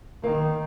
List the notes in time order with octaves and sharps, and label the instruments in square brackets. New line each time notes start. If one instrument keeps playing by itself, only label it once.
[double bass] D#3 [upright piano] A#3